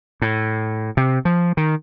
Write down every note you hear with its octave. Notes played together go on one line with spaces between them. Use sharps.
A2
C3
F3
D#3